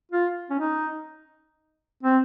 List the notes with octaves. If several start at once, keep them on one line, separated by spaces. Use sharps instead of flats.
F4
C#4
D#4
C4